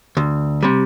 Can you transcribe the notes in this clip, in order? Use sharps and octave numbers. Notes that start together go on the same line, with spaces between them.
D2
C3 G3